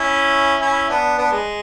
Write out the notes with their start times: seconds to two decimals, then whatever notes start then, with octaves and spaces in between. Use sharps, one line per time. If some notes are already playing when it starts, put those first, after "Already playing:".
Already playing: C#4 E4
0.61 C#4 E4
0.90 B3 D4
1.18 B3 D4
1.32 G#3